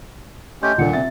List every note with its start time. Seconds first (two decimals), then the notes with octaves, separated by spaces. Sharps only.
0.62 A3 C#4 G4 D#5 C6 G6
0.78 D#1 A#2 D4 F4 A4 F#5 C#7
0.93 C3 E5 A6